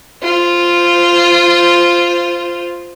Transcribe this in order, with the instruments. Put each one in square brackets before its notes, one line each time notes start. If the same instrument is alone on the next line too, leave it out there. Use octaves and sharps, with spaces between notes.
[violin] F4 C5